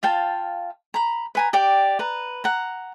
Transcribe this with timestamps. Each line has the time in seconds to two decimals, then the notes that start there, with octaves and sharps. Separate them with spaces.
0.03 F4 F5 G5 A5
0.94 A#5 B5
1.35 B4 G#5 A#5
1.53 G4 D5 G5
1.99 B4 A#5
2.44 F#5 A#5